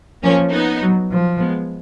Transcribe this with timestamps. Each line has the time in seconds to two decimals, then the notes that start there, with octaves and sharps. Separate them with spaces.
0.23 F3 A#3 C#4
0.52 B3 D#4
0.82 F#3
1.12 F3
1.41 G#3 B3